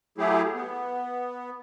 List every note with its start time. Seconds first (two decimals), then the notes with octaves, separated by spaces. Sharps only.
0.18 F#3 A3 E4 G4 G#4
0.54 B3